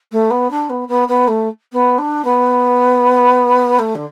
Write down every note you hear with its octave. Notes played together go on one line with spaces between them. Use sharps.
A3
B3
D4
B3
B3
B3
A3
B3
D4
B3
A3
D3